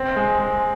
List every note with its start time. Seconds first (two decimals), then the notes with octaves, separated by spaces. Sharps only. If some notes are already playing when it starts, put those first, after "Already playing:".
Already playing: C4
0.16 G#3
0.39 G#3